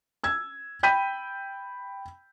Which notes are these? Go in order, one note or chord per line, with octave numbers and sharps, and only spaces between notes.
E6 G#6
G5 B5 G6 B6 D#7